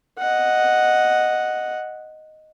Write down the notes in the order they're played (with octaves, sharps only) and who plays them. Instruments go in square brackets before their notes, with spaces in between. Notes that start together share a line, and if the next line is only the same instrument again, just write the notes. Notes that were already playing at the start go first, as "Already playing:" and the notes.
[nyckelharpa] D#5 F#5